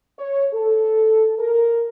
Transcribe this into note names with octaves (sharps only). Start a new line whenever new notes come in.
C#5
A4
A#4